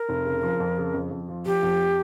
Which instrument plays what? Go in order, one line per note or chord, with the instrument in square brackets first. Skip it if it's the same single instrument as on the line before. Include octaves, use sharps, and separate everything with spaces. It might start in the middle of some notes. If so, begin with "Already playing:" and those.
Already playing: [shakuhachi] A#4
[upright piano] F1
C#3
F3
F2
C#3
F2
F2
F3
[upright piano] F3 [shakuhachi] G4
[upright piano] F2